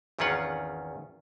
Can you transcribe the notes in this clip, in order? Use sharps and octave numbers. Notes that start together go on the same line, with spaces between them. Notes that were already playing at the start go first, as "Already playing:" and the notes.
G#1 E2 D#3 C#4 F4 F#5